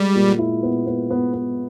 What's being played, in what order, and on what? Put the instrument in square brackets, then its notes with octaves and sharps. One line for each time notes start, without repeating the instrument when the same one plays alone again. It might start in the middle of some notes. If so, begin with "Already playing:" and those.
Already playing: [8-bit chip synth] G3 [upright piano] G#3
[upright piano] A#2
E4
B3
B3
B3
B3